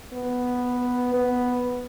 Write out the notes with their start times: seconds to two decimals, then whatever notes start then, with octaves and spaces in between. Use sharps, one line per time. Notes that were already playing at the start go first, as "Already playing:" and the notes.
0.13 B3
1.14 B3